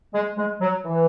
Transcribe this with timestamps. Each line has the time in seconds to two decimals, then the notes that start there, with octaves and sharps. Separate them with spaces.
0.14 G#3
0.37 G#3
0.61 F#3
0.85 E3